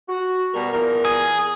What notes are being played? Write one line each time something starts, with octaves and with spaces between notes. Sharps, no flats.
F#4
B2 G3 A#4
E2 A#2 A#4
G#4